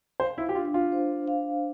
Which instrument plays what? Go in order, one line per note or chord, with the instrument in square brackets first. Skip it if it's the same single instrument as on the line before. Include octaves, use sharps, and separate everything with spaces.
[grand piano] C5 [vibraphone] F5
[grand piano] E4
G4
[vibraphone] D4 [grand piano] F4
[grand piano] F4
[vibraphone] C5
F5